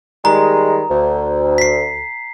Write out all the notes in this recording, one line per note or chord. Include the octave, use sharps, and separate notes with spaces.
D#3 G3 G#3 A#5
D2
B6 C7